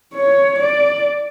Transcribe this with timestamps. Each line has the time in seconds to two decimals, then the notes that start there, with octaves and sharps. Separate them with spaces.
0.14 C#5
0.59 D5